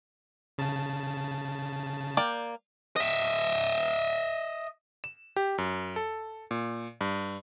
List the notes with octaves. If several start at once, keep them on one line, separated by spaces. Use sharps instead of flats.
C#3 A5
A#3 D5 G5
D#5 E5
E7
G4
F#2
A4
A#2
G2